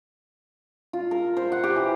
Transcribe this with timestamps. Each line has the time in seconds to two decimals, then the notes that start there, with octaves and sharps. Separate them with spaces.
0.93 F4
1.11 A#4
1.37 C5
1.52 F#5
1.64 G4
1.76 E3